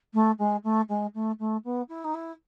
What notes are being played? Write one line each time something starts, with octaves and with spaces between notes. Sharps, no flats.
A3
G#3
A3
G#3
A3
A3
B3
E4
D#4
E4